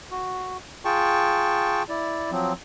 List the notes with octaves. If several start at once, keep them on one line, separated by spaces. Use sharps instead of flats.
F#4
F4 G#4 G5 A5 C#6
E4 D5
F3 F#3 C4